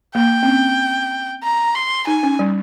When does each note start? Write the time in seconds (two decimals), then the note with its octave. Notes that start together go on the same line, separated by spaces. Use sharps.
0.15 A#3 G5
0.43 C4
0.47 C#4
1.43 A#5
1.75 C6
2.07 D#4 G#5
2.23 C#4
2.39 G3